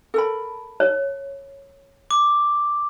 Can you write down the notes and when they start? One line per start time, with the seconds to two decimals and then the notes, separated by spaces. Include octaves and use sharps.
0.14 A4 A#4 B5
0.80 C#5
2.11 D6